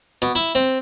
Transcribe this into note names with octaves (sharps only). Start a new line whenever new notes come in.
B2
E4
C4